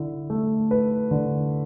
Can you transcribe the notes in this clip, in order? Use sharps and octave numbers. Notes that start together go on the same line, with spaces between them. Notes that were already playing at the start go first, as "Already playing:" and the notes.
Already playing: D3 E4
A3
B4
D3